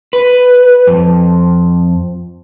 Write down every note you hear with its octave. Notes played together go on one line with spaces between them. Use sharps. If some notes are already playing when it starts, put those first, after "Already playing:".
B4
F2